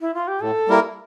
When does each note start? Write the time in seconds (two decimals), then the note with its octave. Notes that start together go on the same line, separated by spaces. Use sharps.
0.01 E4
0.14 F4
0.28 G4
0.41 A2 A4
0.68 G3 A#3 E4 A#4